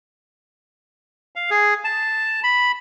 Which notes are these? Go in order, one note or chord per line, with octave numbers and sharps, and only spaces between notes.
F5
G#4
A5
B5